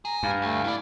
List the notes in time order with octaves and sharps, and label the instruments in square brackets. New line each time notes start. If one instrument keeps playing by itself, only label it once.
[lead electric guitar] G#4 [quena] A#5
[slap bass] G2 [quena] F5
[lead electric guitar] D2 [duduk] A3
[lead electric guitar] F#2 D5 [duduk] E4